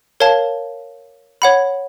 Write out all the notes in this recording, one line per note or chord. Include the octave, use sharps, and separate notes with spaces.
A#4 C#5 F5 A5
C#5 F#5 B5